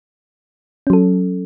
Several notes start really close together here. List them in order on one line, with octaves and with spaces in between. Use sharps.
C#4 F#3 A4